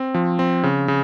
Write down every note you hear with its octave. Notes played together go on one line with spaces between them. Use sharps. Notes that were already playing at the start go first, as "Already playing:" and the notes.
Already playing: C4
F3
C4
C#3
C#3